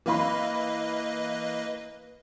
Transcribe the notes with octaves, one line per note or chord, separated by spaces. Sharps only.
E3 A#3 B4 D#5 F5 B5